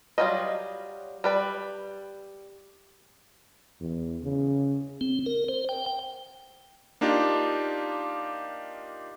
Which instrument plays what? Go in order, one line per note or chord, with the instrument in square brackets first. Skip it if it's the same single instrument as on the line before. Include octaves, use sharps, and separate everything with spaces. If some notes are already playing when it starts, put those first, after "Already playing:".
[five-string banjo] F#3 G3 A#3 F4 D#5
G3 B4 D5
[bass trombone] E2
C#3
[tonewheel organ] C4
A#4
C5
G5
G5
[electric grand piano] A#3 D4 D#4 F4 G4 F5